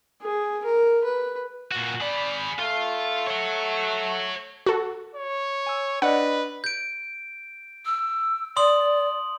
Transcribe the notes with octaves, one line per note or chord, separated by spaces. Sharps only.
G#4
A#4
B4
A#2 F#4
G#4 D5 B5
A3 F4
C#5 F#5
F#4 A4
C#5
G#5 E6
D4 B4 D5 D#5 F#5
G6 D7
E6
D5 C6 D#6 F#7